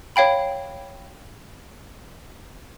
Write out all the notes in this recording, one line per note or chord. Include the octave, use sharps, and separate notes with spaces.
C#5 F5 G5 B5